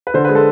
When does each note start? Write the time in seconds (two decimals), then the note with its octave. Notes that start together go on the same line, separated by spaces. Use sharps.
0.07 B4
0.14 D3 C5
0.25 G#3 B4
0.35 A4